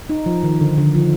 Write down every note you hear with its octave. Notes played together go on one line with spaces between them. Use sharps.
D#4
F3
D#3
D3
D3
F3